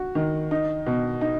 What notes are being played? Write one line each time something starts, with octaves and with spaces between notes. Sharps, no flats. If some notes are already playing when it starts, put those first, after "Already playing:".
Already playing: F#4
D#3
D#4
B2
D#4